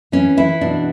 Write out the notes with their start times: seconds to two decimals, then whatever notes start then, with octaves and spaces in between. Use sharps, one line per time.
0.12 E3 C#4
0.37 E3 E4
0.61 B2 D4